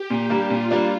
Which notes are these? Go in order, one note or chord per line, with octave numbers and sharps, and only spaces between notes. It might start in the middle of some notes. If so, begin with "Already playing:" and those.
Already playing: G4
A#2
G3 A#3 D4
A#2 F4
G3 A#3 D4